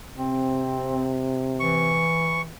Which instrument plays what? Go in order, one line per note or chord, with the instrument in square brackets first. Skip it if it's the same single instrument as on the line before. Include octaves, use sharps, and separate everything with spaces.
[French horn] C3 [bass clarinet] C4
[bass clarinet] E3 [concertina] C#6